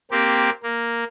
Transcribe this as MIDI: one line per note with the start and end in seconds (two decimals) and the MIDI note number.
0.11 0.50 58
0.11 0.50 60
0.11 0.50 67
0.63 1.04 58